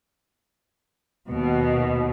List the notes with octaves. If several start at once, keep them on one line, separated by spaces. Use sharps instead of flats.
D#2 B2